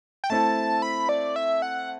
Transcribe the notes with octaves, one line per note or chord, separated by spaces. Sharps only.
G5
A3 C4 E4 A4 A5
B5
D5
E5
F#5